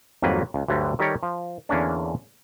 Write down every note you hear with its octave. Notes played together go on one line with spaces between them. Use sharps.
G#1 F2 F#3 G3 A#3 B4
C#2
D2 G2 D3 F#3 G3
D#3 G3 G4 A4 A#4 C#5
F3
E2 D3 A#3 C#4 D4